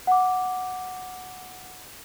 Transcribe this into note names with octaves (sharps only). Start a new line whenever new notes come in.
F#5 D6